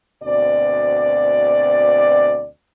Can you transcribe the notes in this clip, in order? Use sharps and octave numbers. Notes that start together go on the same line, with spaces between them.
D2 B2 C4 D5